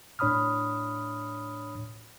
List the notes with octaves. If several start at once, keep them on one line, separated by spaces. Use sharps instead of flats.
A2 D4 C#5 B5 D#6 F6